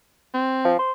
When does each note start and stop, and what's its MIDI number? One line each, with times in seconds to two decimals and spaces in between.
0.34 0.73 60
0.65 0.74 53
0.79 0.92 72